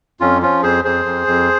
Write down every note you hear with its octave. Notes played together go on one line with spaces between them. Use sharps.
F2 C#4 F4
F3 C#4 F4
F2 G#4 C5
F2 G#4 C5
F2
F2